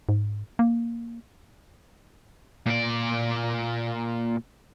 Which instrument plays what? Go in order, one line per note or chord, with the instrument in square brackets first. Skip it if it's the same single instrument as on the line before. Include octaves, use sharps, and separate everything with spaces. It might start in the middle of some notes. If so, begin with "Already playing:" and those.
[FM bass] G#2
A#3
[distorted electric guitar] A#2 D5